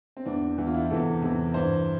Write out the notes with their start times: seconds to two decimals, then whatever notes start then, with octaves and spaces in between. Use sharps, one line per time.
0.17 C4
0.26 E2 E3 D4
0.58 E2 E3
0.66 F4
0.74 E4
0.82 F4
0.90 E2 C3 E3 A4
1.22 E2 C3 E3
1.54 G2 E3 C5